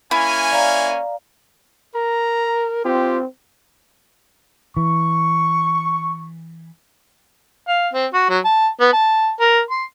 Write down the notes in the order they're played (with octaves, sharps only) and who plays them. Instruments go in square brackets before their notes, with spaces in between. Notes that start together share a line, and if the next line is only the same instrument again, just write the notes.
[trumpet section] A#3 C#4 G#5 [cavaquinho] E4
[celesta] D5 F5 A#5
[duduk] A#4 [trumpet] A#5
[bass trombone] C4 [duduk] F4 [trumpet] G4
[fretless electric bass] E3 [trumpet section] C#6
[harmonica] F5
C4
F#4
F#3
A5
B3
A5
A#4
C6